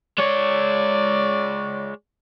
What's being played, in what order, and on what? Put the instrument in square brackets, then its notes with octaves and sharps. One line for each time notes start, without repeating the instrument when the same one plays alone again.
[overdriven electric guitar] G#3 C#5 [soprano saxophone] D5